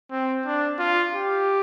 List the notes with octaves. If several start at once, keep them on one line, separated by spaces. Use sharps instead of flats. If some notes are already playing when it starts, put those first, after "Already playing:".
C4
D4
F4
G4